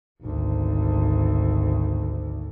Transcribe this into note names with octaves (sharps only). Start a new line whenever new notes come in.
G#1 D2